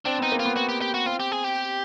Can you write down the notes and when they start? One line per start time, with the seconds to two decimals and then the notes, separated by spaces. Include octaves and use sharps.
0.05 C4 D4
0.19 B3 D#4
0.32 A#3
0.39 F4
0.45 B3
0.56 F#4
0.69 G4
0.81 G4
0.94 F#4
1.06 C4 F4
1.20 G4
1.32 G#4
1.44 G4